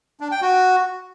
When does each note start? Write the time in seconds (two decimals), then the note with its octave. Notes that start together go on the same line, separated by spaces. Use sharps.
0.20 D4
0.31 G5
0.42 F#4